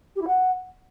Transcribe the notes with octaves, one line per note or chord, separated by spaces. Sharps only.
G4
E4
F#5